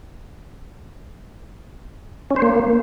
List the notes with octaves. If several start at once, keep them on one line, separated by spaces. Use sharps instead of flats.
C#4
C5
A#3